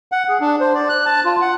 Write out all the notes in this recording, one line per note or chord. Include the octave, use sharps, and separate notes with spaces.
F#5
G#4
D4
C5
D5
F#6
A5
F4
F#5